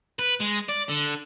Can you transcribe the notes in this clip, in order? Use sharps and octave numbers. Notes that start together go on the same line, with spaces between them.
B4
G#3
D5
D3